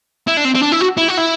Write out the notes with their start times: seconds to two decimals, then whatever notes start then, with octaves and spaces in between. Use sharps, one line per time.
0.27 E4
0.37 D4
0.44 C4
0.54 C4
0.62 D4
0.72 E4
0.81 F#4
0.98 E4
1.09 F#4
1.18 E4